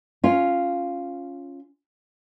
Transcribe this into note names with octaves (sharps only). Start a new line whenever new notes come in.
C#4 F4